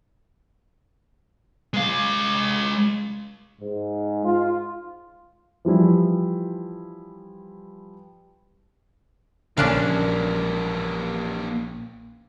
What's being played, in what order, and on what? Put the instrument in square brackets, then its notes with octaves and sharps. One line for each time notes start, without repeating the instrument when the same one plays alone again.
[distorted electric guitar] G#3 F5
[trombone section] G#2
F4
[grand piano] E3 F3 G3 E4
[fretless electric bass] A#1 C#3 [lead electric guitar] E3 A#3 [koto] C#4 D4 F5